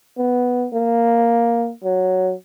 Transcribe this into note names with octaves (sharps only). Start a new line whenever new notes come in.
B3
A#3
F#3